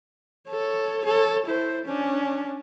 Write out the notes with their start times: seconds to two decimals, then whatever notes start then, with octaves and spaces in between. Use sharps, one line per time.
0.49 A4 C#5
1.05 A4 C#5
1.46 E4 C5
1.85 C#4 D4